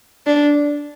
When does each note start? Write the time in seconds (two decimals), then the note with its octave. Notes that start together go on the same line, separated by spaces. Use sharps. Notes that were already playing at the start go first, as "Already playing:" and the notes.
0.26 D4